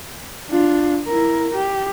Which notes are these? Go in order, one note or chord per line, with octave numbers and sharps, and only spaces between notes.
D4 F4
E4 A#4
G4